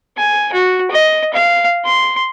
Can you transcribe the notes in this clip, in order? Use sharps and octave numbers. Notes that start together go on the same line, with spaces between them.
G#5
F#4
D#5
F5
C6